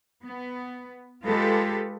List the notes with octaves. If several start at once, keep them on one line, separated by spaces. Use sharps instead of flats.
B3
G#3 F4 G4 A4 B4